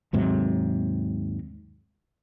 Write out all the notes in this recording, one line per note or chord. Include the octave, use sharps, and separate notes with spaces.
D#2 G#2 C3 F#3